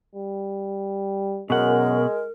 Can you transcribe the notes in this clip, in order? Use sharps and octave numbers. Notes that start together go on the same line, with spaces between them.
G3
F#2 B2 G#3 A#4 F#5